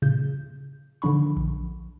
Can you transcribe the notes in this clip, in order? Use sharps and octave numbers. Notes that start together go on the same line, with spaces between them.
A#2 C#3 G6
D3 D#3 F3 D4 B5 C#6
A#1